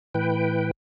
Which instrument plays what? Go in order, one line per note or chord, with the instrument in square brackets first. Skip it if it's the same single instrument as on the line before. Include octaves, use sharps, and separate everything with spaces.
[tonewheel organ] A2 E3 B4 G5